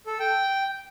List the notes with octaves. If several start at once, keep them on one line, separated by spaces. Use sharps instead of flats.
A4
G5